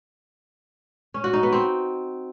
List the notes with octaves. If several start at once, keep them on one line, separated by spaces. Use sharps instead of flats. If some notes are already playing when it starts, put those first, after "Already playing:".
C#4
F#4
D#4
B3
C4